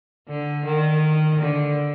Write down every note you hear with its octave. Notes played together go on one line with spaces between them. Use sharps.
D3
D#3
D3